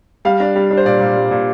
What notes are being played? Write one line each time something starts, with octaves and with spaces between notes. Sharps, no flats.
G3 F5
D4
G3
D4
C5
A#2 D5
A#2
G3
A#2